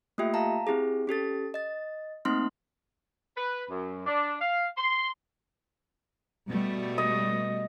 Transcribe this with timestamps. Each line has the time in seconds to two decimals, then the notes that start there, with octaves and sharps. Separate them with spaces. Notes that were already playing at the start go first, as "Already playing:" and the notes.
0.18 A3 A#3 F4 G4 E5 G5
0.34 F5 A5 A#5
0.67 C4 E4 G4 G#4
1.07 C#4 G4 A4 A6
1.54 D#5 A6
2.25 A3 A#3 C4 D#4 C6 F6
3.36 B4
3.69 F#2
4.06 D4
4.40 F5
4.77 C6
6.48 B2 G3 A3
6.98 D#5